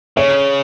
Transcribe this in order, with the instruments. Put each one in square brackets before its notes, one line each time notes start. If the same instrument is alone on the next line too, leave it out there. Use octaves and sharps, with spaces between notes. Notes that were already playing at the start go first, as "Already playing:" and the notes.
[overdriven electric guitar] C#3 [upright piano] C#5